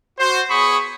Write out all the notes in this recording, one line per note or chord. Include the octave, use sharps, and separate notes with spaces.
F#4 C5
B3 G#4 C#5 B5 C#6 D#6